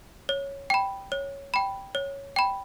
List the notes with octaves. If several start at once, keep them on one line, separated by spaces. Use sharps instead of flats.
C#5
G5 B5
C#5
G5 B5
C#5
G5 B5